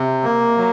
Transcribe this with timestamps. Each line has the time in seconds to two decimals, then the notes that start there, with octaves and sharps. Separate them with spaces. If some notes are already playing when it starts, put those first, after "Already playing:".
Already playing: C3
0.24 A#3
0.58 F#3